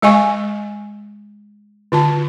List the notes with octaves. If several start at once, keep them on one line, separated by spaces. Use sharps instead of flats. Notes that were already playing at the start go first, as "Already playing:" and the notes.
G#3 D#5 G#5 C#6
D3 F4 A5